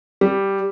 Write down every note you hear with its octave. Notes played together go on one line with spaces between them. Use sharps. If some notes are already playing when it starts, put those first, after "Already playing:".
G3